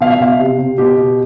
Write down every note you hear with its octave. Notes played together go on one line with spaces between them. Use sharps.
B2 F5
E5
B2 F5
C3
C3
B2 G4
B2